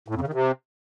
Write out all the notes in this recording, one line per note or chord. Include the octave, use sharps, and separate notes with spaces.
A2
F2
C#3
D#3
C3